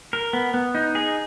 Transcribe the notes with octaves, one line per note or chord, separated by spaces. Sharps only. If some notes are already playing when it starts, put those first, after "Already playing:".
A#4
B3
B3
D#4
G#4